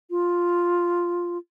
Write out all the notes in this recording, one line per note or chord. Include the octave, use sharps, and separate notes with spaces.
F4